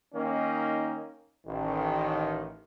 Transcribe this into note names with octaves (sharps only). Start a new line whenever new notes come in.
D#3 A#3 C#4 D#4
A1 D#3